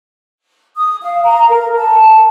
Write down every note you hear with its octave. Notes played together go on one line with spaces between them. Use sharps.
D#6
F5
A#5
A#4
A5